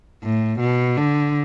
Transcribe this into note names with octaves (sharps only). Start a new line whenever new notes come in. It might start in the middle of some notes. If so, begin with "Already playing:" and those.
A2
B2
D3